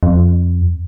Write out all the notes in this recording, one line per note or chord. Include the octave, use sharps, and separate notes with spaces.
F2